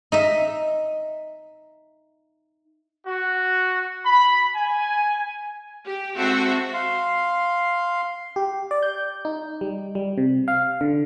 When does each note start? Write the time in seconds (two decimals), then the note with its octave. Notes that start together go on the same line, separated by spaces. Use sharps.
0.12 D#4 D#5 E5
3.06 F#4
4.04 B5
4.55 G#5
5.86 G4
6.17 G#3 C4 F#4 A4 E5
6.74 F5 C6
8.36 G4
8.71 D5
8.83 G6
9.25 D#4
9.61 G3
9.95 G3
10.18 C3
10.48 F5
10.81 D3